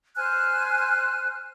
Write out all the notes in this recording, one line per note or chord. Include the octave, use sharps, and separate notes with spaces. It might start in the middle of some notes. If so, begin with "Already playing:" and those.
C5 G#5 F6 F#6